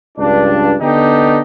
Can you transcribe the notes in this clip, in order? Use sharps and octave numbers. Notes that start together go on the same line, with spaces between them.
C#2 G2 D4
D3 B3 D4 D#4 G4